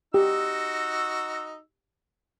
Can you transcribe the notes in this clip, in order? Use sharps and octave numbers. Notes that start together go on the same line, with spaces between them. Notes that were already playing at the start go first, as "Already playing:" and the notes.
D#4 F#4 G4 E6